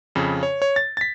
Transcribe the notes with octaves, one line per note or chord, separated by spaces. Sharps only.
F2 C#3
C#5
C#5
A6
A6 B6